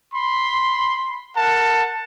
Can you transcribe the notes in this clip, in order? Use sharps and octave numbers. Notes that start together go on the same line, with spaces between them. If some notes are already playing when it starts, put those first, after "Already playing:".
B5 C6
A#4 F#5 A5